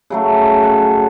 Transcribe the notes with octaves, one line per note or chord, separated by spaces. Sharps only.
C#3 F#3 A3
F#5